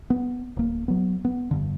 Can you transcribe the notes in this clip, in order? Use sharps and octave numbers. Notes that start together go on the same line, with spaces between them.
B3
D1 A#3
F#3 B3
B3
F1 G2 D3